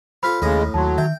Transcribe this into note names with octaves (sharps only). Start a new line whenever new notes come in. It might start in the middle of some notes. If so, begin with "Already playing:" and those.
C4 F4 A4 B5 F6 B6
D#2 A2 C#3 G#3 A#5 D#6
D#2 F#3 A5 C6
D#3 E5 G5